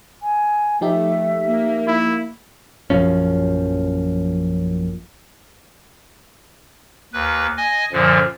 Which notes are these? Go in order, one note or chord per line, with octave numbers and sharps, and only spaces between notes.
G#5
F3 A3 D#4 G4 E5
A#3
E4
A#1 F#2 F3 C#4
D#2 B4
D#5 G#5
F#2 A#2 D3 F3